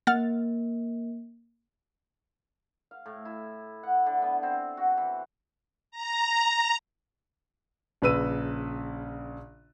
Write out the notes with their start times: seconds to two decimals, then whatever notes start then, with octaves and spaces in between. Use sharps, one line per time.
0.07 A#3 F#5 F6 A6
2.91 F5
3.06 A2
3.25 E4
3.83 F#5
4.06 D3
4.22 B3
4.43 C4
4.77 F#4
4.97 E3
5.91 A#5
8.02 A#1 C#3 B4 E6 D#7